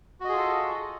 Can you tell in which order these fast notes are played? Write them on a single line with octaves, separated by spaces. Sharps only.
F#4 D#5 G#4 F4 A4